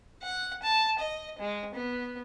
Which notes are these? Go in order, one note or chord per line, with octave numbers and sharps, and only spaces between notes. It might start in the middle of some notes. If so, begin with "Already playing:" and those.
F#5
A5
D#5
G#3
B3